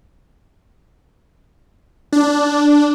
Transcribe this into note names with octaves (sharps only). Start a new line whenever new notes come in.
D4